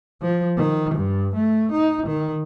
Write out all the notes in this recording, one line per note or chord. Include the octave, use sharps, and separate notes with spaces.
F3
D#3
G2
A3
D#4
D#3